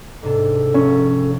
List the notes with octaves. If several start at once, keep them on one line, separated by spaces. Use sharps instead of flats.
G#2 C3 D4 A4
F1 C#4